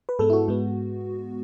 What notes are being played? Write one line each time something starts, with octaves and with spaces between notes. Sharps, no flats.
B4
G#2 G#3 B3 A4
E4
F#4
G#2 G#3 B3